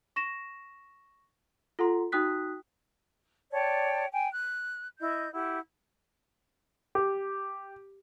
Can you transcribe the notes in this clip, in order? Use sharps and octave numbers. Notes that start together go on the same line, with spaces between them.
C#6 A#6 E7
F4 A4 F#5 A#5 C6
D#4 F#4 G5 D#6 F#6 B6
C#5 D5 G5 A5
G5 G#5
F#6
E4 D#5 G6
E4 G4 F#5
G4